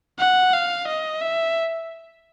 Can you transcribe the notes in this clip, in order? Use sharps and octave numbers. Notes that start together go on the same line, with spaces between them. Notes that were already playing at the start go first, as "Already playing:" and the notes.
F#5
F5
D#5
E5